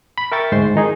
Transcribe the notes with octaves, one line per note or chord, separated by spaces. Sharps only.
B5
A#4 E5 G5 C#6 A6
D2 G#2 G#3 C5 C6
D#3 D#4 G#4